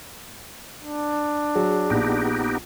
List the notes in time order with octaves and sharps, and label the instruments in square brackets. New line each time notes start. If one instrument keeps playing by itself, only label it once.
[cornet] D4
[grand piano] F#3 [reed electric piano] G#4
[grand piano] A#1 [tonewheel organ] B3 D#4 G4